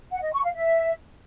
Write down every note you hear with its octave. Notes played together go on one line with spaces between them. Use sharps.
F#5
D#5
C#6
F5
E5